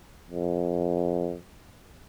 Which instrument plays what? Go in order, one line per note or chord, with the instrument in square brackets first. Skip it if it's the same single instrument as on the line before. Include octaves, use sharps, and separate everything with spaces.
[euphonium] F2